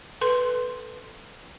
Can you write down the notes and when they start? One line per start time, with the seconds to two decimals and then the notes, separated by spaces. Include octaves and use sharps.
0.21 A4 B4 C6